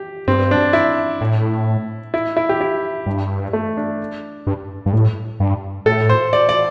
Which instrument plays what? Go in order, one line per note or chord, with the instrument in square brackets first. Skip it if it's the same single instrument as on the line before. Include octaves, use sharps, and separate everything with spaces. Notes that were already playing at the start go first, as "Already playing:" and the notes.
Already playing: [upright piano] G4
[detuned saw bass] G2 [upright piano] C4
[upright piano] D4
E4
[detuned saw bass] A2
[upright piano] E4
E4
G4
E4
[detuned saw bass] G2
[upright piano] A3
D4
[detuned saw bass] G2
G2
A2
G2
[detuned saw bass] A2 [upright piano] A4
[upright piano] C5
D5
D5